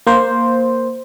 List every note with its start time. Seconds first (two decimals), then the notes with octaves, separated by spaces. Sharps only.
0.07 A#3 C5